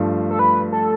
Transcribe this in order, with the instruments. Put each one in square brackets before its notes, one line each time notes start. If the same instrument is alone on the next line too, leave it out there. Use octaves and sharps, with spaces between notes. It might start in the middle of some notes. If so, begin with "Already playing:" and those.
Already playing: [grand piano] G2 F3 A3
[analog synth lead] A4
B4
A4